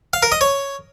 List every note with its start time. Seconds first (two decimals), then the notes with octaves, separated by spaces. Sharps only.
0.13 F5
0.23 A#4
0.32 D#5
0.41 C#5